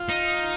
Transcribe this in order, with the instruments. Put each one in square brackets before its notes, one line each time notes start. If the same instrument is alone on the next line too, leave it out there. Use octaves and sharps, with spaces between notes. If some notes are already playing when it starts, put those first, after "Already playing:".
Already playing: [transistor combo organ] F4
[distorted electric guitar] D#4